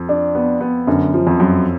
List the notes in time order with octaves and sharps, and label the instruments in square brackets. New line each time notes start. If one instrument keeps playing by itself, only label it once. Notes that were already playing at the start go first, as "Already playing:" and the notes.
Already playing: [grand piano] F2
[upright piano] D4
B3
B3
[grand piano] F#2 [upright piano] D3
[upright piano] F3
[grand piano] F2
[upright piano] F#2